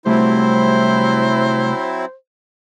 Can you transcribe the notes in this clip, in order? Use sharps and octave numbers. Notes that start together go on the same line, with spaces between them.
C2 F#3 G3 A3 C4 E4 C5